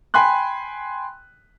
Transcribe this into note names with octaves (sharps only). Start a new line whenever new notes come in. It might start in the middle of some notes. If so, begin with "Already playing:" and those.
G5 G#5 B5 C6 F#6